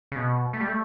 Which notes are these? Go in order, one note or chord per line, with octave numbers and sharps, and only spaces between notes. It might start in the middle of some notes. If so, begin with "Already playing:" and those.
C#3
B2
A3
G3
A3